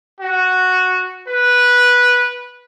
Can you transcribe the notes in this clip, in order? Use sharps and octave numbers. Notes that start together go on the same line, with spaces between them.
F#4
B4